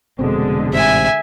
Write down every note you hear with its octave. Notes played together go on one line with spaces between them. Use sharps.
F1 B2 D3 G#3 C4
A1 G#2 C3 E5 G#5